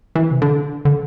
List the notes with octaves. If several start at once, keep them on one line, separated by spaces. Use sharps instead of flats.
E3
C3
D3
D3